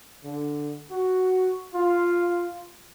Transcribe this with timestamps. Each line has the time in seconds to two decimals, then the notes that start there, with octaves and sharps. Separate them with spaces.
0.24 D3
0.91 F#4
1.74 F4